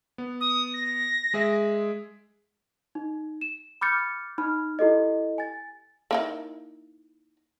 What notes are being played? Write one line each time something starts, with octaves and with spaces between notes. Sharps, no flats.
B3
D#6
A#6
G#3 G#4 E5
D#4
E7
B5 D6 F6 G6 A6 C#7
D#4 B5 F6
E4 G4 A4 D#5
G#5 A6
A#3 D#4 E4